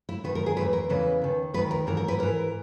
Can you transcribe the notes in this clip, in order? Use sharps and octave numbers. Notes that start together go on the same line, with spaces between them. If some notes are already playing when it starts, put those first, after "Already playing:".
E4
D#2 D#3 B4
A#4
G#4
E2 C#3 E3 B4
A#4
E2 C#3 E3 B4
D#2 D#3
D#2 D#3 B4
A#4
G#2 E3 A#4
A#4
B4
G#2 E3 A#4